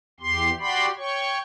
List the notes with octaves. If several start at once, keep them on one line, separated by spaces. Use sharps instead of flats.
E2 G4 C6
F#4 G4 D5 G5 B5 C6
C#5 G5 C#6